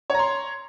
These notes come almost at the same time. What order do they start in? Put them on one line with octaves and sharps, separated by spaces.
C#5 A#5 C6